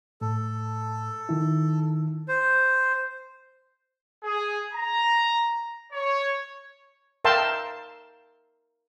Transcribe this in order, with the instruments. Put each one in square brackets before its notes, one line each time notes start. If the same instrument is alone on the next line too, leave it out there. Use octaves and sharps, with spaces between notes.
[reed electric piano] A2 [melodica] A4
[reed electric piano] D#3 E4
[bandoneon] C5
[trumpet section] G#4
A#5
C#5
[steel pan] A#4 E5 F5 G5 A5 C6